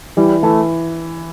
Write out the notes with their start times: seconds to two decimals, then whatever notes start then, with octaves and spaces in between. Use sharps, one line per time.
0.17 E3 G3
0.43 E3 A3